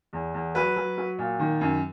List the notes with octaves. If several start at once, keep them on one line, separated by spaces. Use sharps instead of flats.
E2
E2
F#3 B4
F#3
F#3
A#2
D#3
F#2